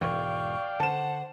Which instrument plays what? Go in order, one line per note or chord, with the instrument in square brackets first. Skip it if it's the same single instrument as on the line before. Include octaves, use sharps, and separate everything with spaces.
[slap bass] E1 G#2 E3 [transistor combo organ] D5 F5 G5 [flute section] C#6
[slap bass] D3 [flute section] C5 F#5 [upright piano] A5 E7